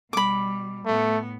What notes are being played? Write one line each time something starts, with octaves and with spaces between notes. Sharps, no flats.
B2 G3 B5 D6
A2 A3 B3